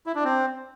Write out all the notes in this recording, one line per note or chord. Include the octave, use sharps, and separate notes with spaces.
E4
D4
C4